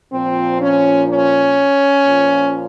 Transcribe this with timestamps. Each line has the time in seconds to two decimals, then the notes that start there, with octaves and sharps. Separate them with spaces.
0.12 A#2 F3 C4
0.61 C#4
1.08 C#4
2.05 A#2 F3